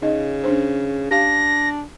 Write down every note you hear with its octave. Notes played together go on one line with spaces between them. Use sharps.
C#3 D#4 D#5
C#4 D4 C5
D4 G4 F5 A#6